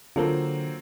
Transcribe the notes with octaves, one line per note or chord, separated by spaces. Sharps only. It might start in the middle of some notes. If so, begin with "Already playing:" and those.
D3 F#3 A#3 C4 F4 A4 A#4